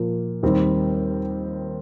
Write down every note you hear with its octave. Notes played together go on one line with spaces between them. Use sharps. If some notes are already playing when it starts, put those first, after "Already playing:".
Already playing: A#2 F3 A#3 F4
D#2 D#3 G3 C4